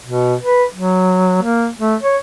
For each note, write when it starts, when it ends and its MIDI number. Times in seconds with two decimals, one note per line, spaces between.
0.06 0.35 47
0.43 0.64 71
0.74 1.40 54
1.42 1.69 58
1.79 1.95 57
2.02 2.18 73